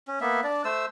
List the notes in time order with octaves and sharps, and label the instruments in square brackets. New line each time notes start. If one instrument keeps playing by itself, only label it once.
[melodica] C#4
A#3 B3 E5
D4 D5
A3 C5 E6